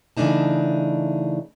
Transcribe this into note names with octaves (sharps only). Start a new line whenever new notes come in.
C#3 E3 A3 D4 D#4 A5